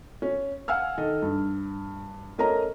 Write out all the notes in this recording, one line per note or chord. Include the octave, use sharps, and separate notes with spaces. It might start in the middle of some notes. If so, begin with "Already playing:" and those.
C#4
F5 F#5 G#5 E6 F6
D#3 A4 D#5
G2
A3 C#4 A#4 D#5 A#5